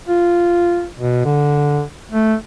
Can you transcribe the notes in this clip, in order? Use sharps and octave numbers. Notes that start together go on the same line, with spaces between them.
F4
B2
D3
A3